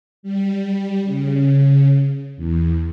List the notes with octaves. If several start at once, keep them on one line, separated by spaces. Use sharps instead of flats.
G3
C#3
E2